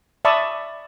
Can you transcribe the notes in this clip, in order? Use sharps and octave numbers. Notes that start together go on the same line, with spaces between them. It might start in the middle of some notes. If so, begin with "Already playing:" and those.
D5 E5 A5 B5 C#6 D#6